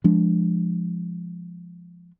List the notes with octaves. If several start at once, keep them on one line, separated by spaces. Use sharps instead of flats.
F3 G#3 D4